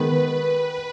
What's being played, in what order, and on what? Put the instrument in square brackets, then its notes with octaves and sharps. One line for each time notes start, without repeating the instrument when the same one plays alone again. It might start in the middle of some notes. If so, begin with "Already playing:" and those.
Already playing: [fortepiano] D#3 G#3 B3 [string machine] B4